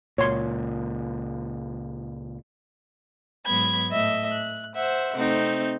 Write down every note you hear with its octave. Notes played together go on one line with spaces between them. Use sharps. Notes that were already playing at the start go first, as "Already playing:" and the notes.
C#2 A#2 C#5 C6
G#2 F#3 B3 B5 G#6
A2 D#5 E5
F#6
C5 E5 F#5
C3 A3 C4 D#4